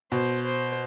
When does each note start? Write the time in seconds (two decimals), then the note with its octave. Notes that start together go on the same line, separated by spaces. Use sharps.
0.12 B2 C5
0.45 C5